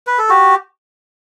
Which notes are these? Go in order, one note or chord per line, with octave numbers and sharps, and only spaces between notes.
B4
A4
F#4 G4